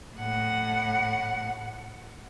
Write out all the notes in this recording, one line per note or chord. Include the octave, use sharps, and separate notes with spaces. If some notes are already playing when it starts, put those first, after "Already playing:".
A2 F#5